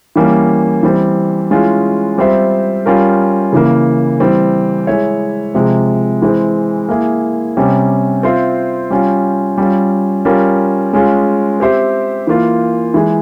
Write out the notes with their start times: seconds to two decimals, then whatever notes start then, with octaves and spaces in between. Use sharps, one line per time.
0.16 E3 G3 A#3 C#4
0.83 E3 G3 C4
1.51 E3 G#3 C#4 F4
2.18 G3 C4 F4 C5 E5
2.86 G3 C#4 F4 A#4
3.52 C#3 E3 A#3
4.20 E3 G3 C4
4.87 G#3 E4 G#4 C#5 E5
5.54 C3 F3 G#3
6.22 E3 G#3 C4
6.89 A#3 E4 G#4
7.57 C3 G3 C#4
8.23 C4 F4 C5 E5
8.90 G3 C#4 F4
9.58 G3 C#4 F4
10.25 G3 C#4 F4 A#4
10.93 G#3 C#4 F4
11.60 C4 G4 C5 E5
12.27 E3 A#3 F4
12.94 E3 G#3 E4 G#4